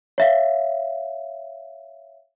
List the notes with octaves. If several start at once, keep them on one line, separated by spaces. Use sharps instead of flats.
C#5 E5 F5